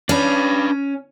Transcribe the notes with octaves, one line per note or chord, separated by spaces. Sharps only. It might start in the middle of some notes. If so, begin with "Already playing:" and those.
C#4 D4 B4